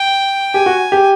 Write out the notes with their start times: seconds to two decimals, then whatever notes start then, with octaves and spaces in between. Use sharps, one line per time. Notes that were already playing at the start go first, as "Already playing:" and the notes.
Already playing: G5
0.54 G4 G#5
0.66 F#4
0.92 G4